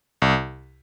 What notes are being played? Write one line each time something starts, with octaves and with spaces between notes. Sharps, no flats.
C2